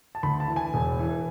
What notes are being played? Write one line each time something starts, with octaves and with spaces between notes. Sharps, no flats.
A5
D2 B5
A5
E3
G#5
E1
E3